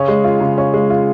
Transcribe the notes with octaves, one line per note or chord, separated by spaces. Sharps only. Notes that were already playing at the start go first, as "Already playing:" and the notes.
Already playing: C#3 C#4
G#3
F4
C#3
C#4
G#3
F4